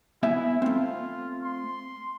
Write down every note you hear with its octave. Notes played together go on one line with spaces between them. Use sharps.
B3 E4 E5 G#5
A3 C4 F4
C6